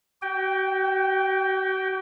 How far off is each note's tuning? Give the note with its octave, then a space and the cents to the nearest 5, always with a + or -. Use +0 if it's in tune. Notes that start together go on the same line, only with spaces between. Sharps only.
F#4 +45 G5 +0